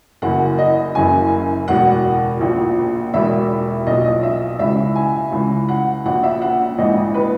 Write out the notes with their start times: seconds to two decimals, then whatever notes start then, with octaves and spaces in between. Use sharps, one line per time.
0.22 F#1 F#2 C#3 E3 F#5
0.58 D#5
0.95 F#1 F#2 C#3 E3 G#5
1.68 E1 E2 B2 F#5
2.41 A#1 A#2
3.14 E1 E2 B2 E5
3.87 B1 A#2 D#5
4.05 D#5
4.23 E5
4.59 C#2 C#3 E3 E5
4.96 G#5
5.32 C#2 C#3 E3
5.69 F#5
6.05 A#1 A#2 F#5
6.23 E5
6.42 F#5
6.78 A#1 G#2 E3 D#5
7.14 B4